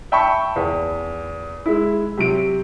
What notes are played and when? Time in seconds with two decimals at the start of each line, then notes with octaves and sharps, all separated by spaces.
0.12 E5 G5 A5 B5 C#6
0.56 E2
1.66 G#3 E4
2.17 C3 F#3 D7